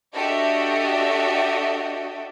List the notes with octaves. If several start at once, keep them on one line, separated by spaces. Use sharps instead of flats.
D4 F#4 G4 A4 D#5 E5